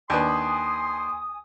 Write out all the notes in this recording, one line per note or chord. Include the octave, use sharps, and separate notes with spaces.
D#2 D4 B4 G#5 C6 D#6